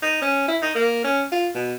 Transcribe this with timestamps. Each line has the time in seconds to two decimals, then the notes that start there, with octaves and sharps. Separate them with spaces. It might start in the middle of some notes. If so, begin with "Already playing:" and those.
0.03 D#4
0.22 C#4
0.48 E4
0.62 D#4
0.75 A#3
1.04 C#4
1.32 F4
1.55 B2